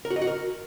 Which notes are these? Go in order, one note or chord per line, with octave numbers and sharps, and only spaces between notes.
A#4
F#4
D#5
F#4
A#4